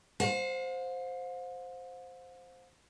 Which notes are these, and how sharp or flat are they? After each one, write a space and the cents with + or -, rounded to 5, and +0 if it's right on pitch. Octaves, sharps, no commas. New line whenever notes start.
C5 +0 F5 +45